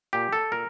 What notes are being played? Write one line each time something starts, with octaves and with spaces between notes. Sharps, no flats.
A#2 G4
A4
A#2 A#4